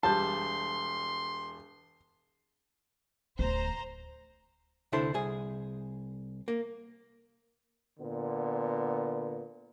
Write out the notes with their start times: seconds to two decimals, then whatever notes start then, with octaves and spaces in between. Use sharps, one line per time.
0.03 E1 G3 A5 C6 G6
3.39 D1 D2 C5 A#5
4.92 D2 C3 D4 E4 A4 C5
5.14 C2 G#4
6.48 A#3
8.00 A#2 D3 B3